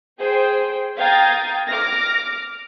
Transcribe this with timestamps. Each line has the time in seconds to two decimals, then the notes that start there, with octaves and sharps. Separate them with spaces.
0.18 G#4 C5 G5
0.98 F5 G5 A#5 D#6 G#6 A6
1.67 D6 F6 A#6